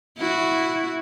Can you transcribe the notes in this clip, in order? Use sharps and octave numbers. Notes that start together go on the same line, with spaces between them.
E4 F#4